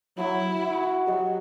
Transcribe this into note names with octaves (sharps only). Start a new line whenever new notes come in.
F#3 E4
F#4
F#3 G4 D#5